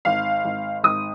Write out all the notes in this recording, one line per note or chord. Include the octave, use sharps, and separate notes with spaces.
G#1 F5
G#1
G#1 D#6